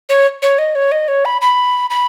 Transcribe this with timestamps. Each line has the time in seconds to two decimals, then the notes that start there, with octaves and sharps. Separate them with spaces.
0.09 C#5
0.42 C#5
0.58 D#5
0.75 C#5
0.92 D#5
1.08 C#5
1.25 B5
1.41 B5
1.90 B5